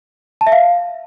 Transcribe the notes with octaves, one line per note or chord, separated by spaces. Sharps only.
A5
E5
F5